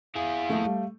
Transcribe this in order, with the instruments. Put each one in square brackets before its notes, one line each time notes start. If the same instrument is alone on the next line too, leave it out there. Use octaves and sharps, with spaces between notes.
[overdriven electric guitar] E4 G#4 [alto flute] F5
[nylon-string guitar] F3 A#3 [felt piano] A3
[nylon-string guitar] G3